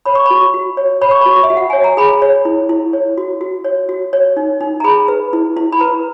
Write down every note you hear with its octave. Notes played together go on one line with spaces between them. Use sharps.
C#5 B5
C#6
F#4 B5
F#4
C#5
C#5 B5
C#6
F#4 B5
E5
F#4
F#5
C#5 G#5
A#5
G#4 B5
C#5
E4
E4
C#5
F#4
F#4
C#5
F#4
C#5
D#4
D#4
A#5
G#4 B5
B4
E4
E4
B5
B4 A#5